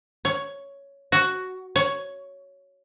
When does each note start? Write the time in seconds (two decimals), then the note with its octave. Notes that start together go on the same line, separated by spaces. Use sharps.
0.25 C#5
1.12 F#4
1.76 C#5